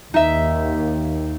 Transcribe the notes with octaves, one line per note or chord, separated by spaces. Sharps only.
D#2 D#4 E5